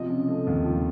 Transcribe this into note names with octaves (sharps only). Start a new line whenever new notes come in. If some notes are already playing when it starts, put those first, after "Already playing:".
Already playing: C3 F3 D#5
C#3
A3
D#2
F3